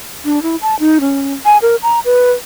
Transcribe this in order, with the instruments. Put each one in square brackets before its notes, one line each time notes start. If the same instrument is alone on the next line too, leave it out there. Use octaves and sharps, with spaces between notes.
[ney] D4
E4
A5
D#4
C#4
G#5
A#4
A#5
B4